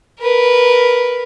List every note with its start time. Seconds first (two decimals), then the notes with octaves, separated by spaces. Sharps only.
0.20 A#4 B4